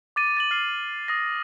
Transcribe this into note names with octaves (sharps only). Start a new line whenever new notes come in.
D6 A6 D#7
A6 D#7 F#7
F6 A6 C7
D#6 A#6